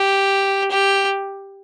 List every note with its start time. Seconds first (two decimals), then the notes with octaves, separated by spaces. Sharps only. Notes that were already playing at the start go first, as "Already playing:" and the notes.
Already playing: G4
0.71 G4